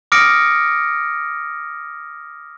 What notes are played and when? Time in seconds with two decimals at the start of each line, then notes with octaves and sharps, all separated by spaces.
0.12 D6 D#6 F6 A#6 C#7 D7